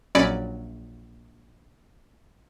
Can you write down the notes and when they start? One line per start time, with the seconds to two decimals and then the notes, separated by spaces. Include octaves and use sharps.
0.15 A#1 F#3 C#4 D5 B5 C#7